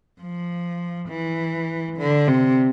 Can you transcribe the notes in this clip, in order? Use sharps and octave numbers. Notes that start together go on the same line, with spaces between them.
F3
E3
D3
C3